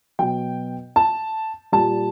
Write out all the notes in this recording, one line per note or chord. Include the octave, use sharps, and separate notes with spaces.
B2 F#3 G5
A5
A#2 G3 A5